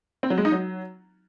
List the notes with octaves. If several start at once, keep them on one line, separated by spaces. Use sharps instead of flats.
C4
F#3
G#3
D#4
F#3